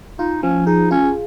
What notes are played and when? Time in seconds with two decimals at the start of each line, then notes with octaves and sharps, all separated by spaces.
0.19 D#4 F4
0.43 F3 C#4
0.66 D#4 G#4
0.91 C#4 F4